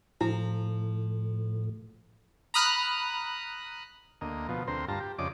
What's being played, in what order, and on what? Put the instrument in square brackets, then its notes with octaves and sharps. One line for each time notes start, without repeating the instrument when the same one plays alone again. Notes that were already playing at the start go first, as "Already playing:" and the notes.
[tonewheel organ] A2 [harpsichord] F3 [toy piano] E4
[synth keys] A#5 B5 D#6 F6 F#6
[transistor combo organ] D2 A#3 D#5
B2 F3
D2 C4 A#4 C5
G2 F4 A5 A#5
G4
F2 C#3 D5 D#5 D6